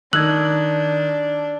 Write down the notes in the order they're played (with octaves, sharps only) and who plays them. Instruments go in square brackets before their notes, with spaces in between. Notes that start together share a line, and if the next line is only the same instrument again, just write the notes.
[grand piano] D#3 [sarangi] D4 [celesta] E6 G#6 [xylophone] F#6 F#7